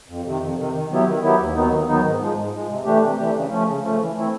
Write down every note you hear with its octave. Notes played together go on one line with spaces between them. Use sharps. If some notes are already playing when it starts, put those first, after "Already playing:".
F2
C3 D#3
F2
C3 D#3
D#3
F#3 B3 E4 G4
D#3
F#3 B3 E4 G4
D#2
D#3 F#3 B3 D#4
D#2
D#3 F#3 B3 D#4
G#2
F3 G#3
G#2
F3 G#3
C3
E3 A3 D4 G4
C3
E3 A3 D4 G4
C#3
F3 A3 C#4
C#3
F3 A3 C#4
E3
A3 C4 E4